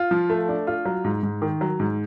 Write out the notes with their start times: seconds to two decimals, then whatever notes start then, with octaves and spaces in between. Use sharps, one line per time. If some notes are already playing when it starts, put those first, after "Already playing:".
Already playing: F4
0.11 F3
0.30 A3
0.48 D4
0.67 F4
0.85 F#3
1.04 G#2
1.23 G#2
1.42 D#3
1.61 F#3
1.80 G#2